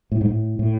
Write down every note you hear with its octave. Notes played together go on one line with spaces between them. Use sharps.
A2
G#2
A2
A2